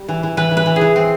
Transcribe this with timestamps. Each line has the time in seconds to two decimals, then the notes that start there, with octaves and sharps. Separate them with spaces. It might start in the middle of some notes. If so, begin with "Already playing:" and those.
Already playing: G3
0.09 E3
0.23 E3
0.37 E3 B4
0.51 E3
0.57 B4
0.66 E3
0.76 G#4
0.81 E3
0.96 C4